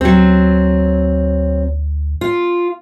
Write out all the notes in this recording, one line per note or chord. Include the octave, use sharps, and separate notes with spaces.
D2 F#3 C4
F4